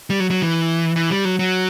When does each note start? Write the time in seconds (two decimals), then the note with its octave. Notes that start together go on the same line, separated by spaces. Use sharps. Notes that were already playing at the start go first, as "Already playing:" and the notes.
0.10 G3
0.20 F#3
0.30 F#3
0.42 E3
0.96 E3
1.11 G3
1.25 F#3
1.39 F#3